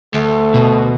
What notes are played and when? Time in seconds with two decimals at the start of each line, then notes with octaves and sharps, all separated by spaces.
0.14 D2 A3
0.54 B2